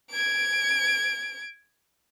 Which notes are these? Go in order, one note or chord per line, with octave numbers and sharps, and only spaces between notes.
G#6 D7